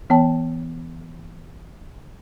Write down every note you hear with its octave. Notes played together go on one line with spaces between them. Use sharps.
E3 B3 C#5 G5 A5